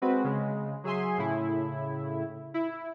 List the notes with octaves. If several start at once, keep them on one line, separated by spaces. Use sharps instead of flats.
G#3 C4 F#4 B4
C#3 G#3
F#3 G#4 E5 G#5 C6
A2 C#3 E4
E4